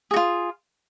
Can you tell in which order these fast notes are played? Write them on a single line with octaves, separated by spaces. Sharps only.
G#4 F#4 F4